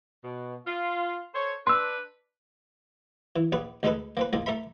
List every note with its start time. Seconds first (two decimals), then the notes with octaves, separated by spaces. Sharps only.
0.24 B2
0.67 F4
1.35 A4 C5 C#5
1.67 D4 B4 C6 E6
3.36 E3
3.52 A#1 G#4 B4
3.83 D2 G#3 D#4 G#4 A4 B4
4.17 A#3 C4 B4
4.33 C#2 G#2 A#3 G#4
4.46 A3 A#4 E5 B5